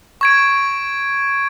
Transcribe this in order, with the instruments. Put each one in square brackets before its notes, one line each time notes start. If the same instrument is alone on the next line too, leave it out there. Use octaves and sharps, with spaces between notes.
[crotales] C#6 G#6 D7